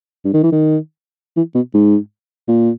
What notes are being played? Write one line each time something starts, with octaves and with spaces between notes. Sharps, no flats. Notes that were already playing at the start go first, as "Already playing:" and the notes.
G2
D#3
E3
D#3
E3
B2
G#2
A#2